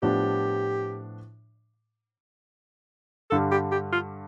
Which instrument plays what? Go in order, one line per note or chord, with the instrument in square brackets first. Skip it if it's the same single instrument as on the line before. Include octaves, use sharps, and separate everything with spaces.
[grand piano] A2 F3 B3 D4 [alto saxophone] G4
[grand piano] G2 D3 G3 [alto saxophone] A4
[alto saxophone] G4
G4
F4